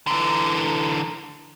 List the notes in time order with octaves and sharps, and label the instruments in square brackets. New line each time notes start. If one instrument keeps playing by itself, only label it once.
[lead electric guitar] D3 E3 [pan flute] A#5